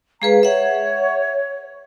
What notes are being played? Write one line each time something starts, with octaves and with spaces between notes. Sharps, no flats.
G#3 G#4 B4 F5 A#5
C#5 E5 F#5